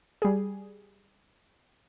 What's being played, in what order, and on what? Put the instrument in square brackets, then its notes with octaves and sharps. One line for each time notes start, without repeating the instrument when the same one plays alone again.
[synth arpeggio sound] G3 G#4